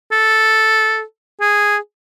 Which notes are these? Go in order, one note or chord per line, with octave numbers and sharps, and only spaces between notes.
A4
G#4